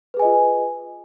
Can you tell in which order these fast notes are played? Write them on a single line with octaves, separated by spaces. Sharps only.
B4 G#4 G#5 D#5 F4